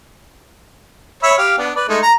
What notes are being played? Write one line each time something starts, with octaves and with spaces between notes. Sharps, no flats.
C#5 E5 B5
G4 F5
B3 D4
B4 D5
G#3 A3 D#4
A#5